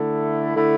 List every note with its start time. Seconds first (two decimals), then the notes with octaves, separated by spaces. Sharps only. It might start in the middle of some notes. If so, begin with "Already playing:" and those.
Already playing: D3 A3 E4 A4
0.55 D3 A3 E4 A4